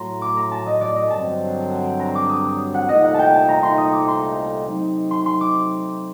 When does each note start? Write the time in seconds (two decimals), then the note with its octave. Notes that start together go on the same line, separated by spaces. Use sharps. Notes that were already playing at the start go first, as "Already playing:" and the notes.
Already playing: A2 F#3 A3 A#5 C6
0.22 D6
0.37 A#5
0.51 A5
0.66 D#5
0.81 D5
0.96 D#5
1.10 G2 D3 F#3 C4 A5
2.00 A#5
2.15 D6
2.30 D#6
2.44 D#6
2.74 F#5
2.88 C2 A#2 A3 D#4 D#5
3.03 F#5
3.14 G5 A5
3.33 A5
3.49 A#5
3.63 C6
3.78 D#6
3.93 D6
4.08 C6
4.67 C3 F#3 A3 C4 D#4
5.11 C6
5.26 C6
5.41 D6